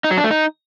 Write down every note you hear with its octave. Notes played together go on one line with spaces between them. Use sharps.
D#4
F#3
D4
A3
D#4